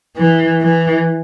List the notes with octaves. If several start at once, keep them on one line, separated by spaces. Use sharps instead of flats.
E3
E3